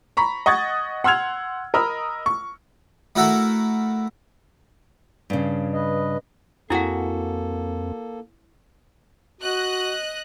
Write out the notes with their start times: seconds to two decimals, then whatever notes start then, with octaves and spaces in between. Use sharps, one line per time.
0.17 A#5 B5 C#6 B6
0.46 D#5 F#5 C#6 G#6 A6
1.04 F#5 C6 E6 F6 G#6 F7
1.74 A#4 D#5 B5 E6 F6
2.26 C#6
3.16 A3 E4 F#4 A4 A#4
5.30 G2 C#3
5.74 B4 D#5
6.70 F2 A#3 C4 E4 F#4 G#4 A4 F#5
9.41 F#4 D#5 F#6